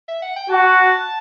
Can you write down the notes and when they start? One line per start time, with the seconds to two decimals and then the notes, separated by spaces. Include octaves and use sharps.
0.08 E5
0.22 F#5
0.36 G5
0.49 F#4 A5